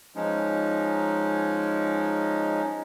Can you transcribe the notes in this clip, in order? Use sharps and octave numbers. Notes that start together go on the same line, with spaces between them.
F3 G#3 C#4 D#4